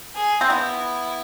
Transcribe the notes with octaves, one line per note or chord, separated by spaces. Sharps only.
G#4
C4
B3 E4